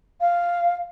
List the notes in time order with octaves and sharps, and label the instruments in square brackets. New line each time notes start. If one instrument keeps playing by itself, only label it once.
[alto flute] F5